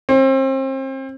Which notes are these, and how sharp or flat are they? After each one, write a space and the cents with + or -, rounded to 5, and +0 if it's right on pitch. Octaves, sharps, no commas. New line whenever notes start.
C4 +35